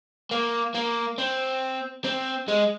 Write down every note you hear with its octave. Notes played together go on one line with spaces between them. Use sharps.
A#3
A#3
C4
C4
G#3